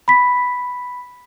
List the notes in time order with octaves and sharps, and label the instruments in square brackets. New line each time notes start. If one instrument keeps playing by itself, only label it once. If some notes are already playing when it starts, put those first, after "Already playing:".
[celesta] B5 B6